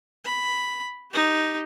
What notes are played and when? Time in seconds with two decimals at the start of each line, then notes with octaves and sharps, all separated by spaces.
0.25 B5
1.12 D#4 G4